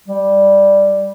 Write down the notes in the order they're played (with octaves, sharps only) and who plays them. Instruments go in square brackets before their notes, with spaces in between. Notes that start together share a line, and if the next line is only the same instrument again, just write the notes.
[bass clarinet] G3